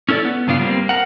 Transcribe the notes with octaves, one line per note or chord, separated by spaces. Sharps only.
C#4 E4 A4 C#5 D5
B3
G2 C#3 B3 D4 F4
G3 A#3 C4
A#4 F#5